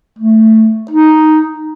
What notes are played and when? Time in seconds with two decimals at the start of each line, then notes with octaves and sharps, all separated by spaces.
0.19 A3
0.91 D#4